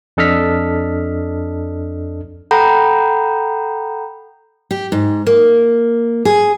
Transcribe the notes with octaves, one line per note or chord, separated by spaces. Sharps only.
F2 D4 A4 D#5 F6 B6
A4 F#5 G5 A#5 B5 G6
G4
G#2
A#3
G#4